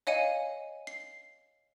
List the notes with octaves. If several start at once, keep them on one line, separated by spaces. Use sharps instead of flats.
C#5 D#5 F5 G#5 C#7 D#7
C7